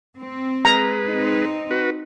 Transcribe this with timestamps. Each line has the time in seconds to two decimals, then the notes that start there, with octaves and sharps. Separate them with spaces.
0.17 C4
0.65 G#3 B4 A#5
1.07 C4 D#4
1.71 F#4 B4